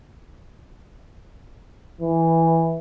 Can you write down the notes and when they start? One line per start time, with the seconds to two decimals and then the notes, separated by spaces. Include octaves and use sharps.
2.01 E3